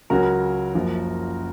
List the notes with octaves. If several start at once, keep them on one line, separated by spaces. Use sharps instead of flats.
C#2 C#3 F#3 C#4 F#4 A#4
F#1 F#2 F3